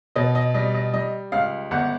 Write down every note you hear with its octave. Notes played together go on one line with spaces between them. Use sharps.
B2 D#5
D#5
G3 D#5
D#5
G3 D#5
C#2 F5
G1 F#5